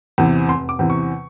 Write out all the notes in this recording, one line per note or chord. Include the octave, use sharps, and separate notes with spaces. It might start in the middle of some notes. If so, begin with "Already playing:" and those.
E2 C3 E3
F1 C6
D6
E2 C3 E3
C#6